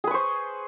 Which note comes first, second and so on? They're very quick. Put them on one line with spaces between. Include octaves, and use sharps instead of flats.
G#4 B4 C#6 C5